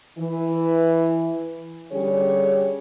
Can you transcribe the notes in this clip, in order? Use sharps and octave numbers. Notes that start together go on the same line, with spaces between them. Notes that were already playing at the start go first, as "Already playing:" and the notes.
E3
D3 G3 C#4 G4 G#4 C#5